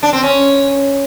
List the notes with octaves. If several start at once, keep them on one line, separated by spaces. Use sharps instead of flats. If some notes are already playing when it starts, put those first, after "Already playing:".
D4
C4
C#4